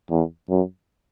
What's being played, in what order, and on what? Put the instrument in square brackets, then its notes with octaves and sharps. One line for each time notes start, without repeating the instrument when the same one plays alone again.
[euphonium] E2
F#2